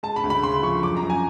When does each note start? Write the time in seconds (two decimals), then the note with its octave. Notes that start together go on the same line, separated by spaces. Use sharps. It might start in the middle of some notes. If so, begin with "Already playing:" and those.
0.03 G#3 A5
0.16 B5
0.24 D2
0.30 B5
0.43 C#3 C6
0.63 F3 C#6
0.83 F#2 D6
0.97 A#5
1.03 F#2
1.10 G#5